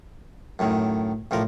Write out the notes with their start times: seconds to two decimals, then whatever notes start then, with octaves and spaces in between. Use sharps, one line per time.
0.59 F#2 A2 D#3
1.31 A1 A2 F3 A#4